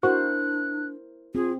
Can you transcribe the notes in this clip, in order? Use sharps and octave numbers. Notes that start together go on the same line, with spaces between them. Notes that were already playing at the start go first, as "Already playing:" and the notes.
D4 E4 F#4 A#4 C5 F#6
C4 F4 G#4